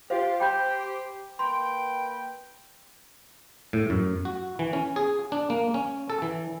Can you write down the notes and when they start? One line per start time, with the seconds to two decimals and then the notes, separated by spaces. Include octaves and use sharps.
0.10 F4 G4 C5 F5
0.40 G4 C5 G5 B5 G6
1.39 A#3 B4 G5 C6
3.73 A2
3.90 F#2
4.25 F#4
4.59 E3
4.73 C#4
4.96 G#4
5.32 D4
5.50 A#3
5.74 C#4
6.10 A4
6.22 E3